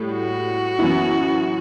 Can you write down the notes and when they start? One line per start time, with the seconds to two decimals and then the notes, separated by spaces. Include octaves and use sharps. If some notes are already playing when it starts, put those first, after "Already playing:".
Already playing: A2 G3
0.13 F#4
0.79 F#2 E3 B3 E4